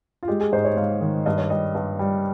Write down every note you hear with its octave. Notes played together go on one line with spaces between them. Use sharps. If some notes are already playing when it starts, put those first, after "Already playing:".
F4
G#3 G4
G#4
G#2 C5
C#5
G#2 F5
D#3
G2 D#5
C#5
G3 D#5
G2
G3